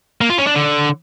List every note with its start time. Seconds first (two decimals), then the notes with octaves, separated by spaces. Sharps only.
0.21 A#3
0.30 F4
0.38 C#4
0.47 D4
0.55 D3